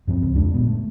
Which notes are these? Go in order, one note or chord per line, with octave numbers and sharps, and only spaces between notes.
G2 F3 C4
C#2
F2 G#3 D4
F#1 A#2 D3 B3
A3